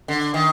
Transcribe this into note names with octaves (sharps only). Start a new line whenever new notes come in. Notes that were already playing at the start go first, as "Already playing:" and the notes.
D3
D#3